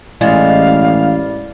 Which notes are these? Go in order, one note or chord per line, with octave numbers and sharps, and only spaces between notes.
A1 G#3 E4 D5 F5